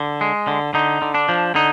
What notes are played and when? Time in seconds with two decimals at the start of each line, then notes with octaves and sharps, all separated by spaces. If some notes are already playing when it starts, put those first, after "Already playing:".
Already playing: D3
0.21 G#3
0.48 D3
0.74 D3 D#4
1.02 D3
1.14 D4
1.29 F3
1.55 D3 D#4